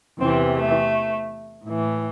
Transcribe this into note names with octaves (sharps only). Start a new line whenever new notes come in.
E2 C3 E3 C4
A3
A2 E3